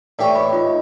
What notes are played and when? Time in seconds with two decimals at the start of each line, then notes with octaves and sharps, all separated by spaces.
0.19 A2 E3 A3 G4 D5 E5 C#6
0.35 C#5 G5 B5
0.53 D#4 F4